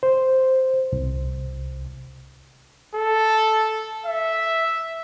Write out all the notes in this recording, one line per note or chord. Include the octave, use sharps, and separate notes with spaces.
C5
C2
A4
E5